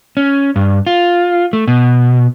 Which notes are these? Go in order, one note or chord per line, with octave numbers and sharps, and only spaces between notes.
C#4
G2
F4
A3
B2